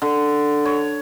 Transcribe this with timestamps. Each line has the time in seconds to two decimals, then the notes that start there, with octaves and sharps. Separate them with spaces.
0.02 D3
0.65 C#5